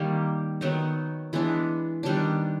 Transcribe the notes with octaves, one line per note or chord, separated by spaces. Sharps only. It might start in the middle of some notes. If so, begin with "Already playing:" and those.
Already playing: D#3 G3 A#3
D#3 F#3 B3 D#4
E3 G#3 B3 D4
D#3 G3 B3 D4